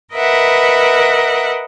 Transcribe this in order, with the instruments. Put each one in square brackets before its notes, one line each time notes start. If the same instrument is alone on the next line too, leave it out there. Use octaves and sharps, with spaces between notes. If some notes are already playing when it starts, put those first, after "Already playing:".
[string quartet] A#4 B4 D#5 E5 F#5